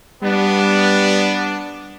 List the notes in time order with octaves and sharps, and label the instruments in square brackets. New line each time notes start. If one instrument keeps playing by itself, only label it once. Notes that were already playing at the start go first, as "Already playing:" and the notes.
[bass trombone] G3 [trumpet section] B3 D4